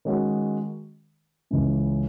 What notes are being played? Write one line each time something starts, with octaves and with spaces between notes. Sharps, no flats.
D#3 G#3 C#4 F#4
C#2 C#3 E3